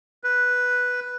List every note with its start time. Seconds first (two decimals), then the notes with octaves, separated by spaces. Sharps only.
0.24 B4